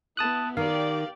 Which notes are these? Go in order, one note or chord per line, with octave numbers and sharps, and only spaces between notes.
B3 E4 A5 D#6 F#6
D#3 G4 D5 F5